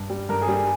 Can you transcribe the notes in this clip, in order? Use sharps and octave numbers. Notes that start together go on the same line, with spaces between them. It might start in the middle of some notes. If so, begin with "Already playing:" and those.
Already playing: G2
G3
G2 A#4
G#4
G3
G#4